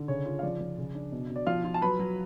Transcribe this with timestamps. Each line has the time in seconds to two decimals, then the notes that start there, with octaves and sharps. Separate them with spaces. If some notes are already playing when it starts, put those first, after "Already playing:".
Already playing: D3
0.08 C#3 C#5
0.26 F4
0.39 F5
0.43 F3 D5
0.60 F3
0.78 C#3
0.95 D4
1.12 B2
1.30 B2
1.36 D5
1.47 F3 F4 F5
1.64 F4
1.74 A5
1.82 F#3 B4 B5
1.99 F#3